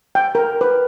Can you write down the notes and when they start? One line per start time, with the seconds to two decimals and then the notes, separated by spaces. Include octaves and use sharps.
0.15 G5
0.35 A#4
0.61 B4